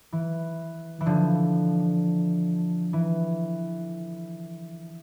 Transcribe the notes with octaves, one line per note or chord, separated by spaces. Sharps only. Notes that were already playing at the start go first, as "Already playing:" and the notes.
E3
E3
D3 F3
E3